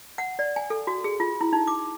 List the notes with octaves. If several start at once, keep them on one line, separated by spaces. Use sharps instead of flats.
F#5
D5
G#5
A4
F#4
G#4
F4
E4
D#4
D6